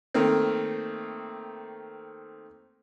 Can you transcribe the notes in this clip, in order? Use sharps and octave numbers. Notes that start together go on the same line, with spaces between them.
D#3 A3 A#3 C4